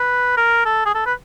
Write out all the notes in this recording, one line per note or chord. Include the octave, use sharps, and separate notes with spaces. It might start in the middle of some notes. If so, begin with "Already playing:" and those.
Already playing: B4
A#4
A4
G#4
A4
B4